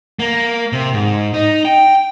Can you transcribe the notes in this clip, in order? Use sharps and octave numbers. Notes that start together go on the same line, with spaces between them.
A#3
C3
G#2
D#4
G5